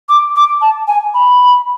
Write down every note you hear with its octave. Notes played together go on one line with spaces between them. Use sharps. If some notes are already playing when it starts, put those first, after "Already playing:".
D6
D6
A5
G#5
B5